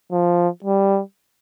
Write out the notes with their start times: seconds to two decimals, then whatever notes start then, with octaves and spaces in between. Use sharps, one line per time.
0.12 F3
0.64 G3